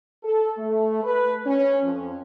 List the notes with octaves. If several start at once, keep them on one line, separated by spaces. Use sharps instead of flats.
A4
A3
B4
C#4
F2